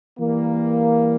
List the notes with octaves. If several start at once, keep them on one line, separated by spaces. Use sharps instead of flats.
E3 G3 A#3